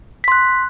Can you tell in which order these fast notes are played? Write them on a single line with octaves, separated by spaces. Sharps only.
B6 C6 F#6